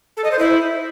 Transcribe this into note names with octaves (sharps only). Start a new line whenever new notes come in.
A4
D#5
C5
E4